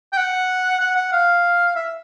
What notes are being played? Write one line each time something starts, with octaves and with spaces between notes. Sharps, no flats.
G5
F#5
F#5
F#5
F5
E5